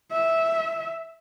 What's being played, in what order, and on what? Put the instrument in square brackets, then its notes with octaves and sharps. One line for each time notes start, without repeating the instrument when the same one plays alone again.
[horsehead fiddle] E5